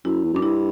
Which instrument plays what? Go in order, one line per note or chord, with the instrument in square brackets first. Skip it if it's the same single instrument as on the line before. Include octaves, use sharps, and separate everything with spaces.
[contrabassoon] F#2 [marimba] E4
[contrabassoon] E2
[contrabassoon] F#2 [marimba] D4
[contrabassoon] G2 [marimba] E4